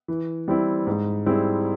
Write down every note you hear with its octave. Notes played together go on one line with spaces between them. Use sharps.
E3
G3 C4 E4
G#2
G3 C4 E4 G#4